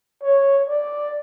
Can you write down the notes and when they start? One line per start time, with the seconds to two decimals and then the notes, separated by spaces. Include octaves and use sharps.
0.22 C#5
0.69 D5